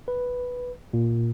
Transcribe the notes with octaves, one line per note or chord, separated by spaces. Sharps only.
B4
A#2